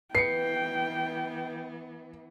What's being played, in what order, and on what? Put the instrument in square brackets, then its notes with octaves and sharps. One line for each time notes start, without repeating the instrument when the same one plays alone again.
[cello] E3 B3 [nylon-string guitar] B4 [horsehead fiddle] G5 [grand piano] C7 C#7